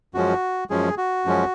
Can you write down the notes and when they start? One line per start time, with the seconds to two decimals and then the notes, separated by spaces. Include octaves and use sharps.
0.14 F#2 F3 G#3 C#4 F#4
0.70 F#2 F3 G#3 C#4 G#4
0.98 F#4
1.26 F#2 F3 G#3 C#4